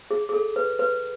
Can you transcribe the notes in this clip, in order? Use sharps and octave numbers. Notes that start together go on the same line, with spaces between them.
G#4
G#4
A4
B4
B4